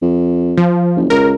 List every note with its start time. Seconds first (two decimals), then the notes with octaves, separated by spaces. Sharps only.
0.02 F2
0.57 F3
0.96 F#1
1.10 C#2 A#4